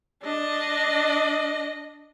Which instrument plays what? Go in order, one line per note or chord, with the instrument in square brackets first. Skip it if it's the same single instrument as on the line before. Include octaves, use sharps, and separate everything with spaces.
[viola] D4 D#5